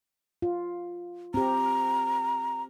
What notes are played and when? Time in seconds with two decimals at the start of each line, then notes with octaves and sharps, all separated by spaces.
0.42 F4
1.34 C4 G4 A#5